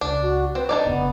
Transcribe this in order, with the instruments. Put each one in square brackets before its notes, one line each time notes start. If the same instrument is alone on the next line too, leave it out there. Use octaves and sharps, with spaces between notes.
[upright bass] C#2 [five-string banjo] D4
[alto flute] F#4
[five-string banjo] C4 [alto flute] B4
[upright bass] F2 [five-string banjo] D4 D#4 D5
[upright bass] F1 C#3 [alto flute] B3